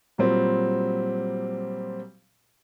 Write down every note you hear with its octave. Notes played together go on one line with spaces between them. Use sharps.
A#2 F#3 G3 C4